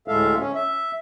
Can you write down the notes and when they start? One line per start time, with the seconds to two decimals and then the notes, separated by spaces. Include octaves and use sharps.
0.08 D2 A2 G#3 A4 E5 F5
0.38 C#4
0.55 E5